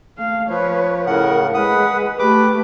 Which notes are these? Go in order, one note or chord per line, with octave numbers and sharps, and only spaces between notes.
A3 F5
F3 B4 C#5
A2 C#3 A#4 F#5
G#3 B4 F#5 D#6
A3 G4 B4 D6